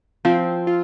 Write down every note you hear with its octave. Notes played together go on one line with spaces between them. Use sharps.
F3 C4
F4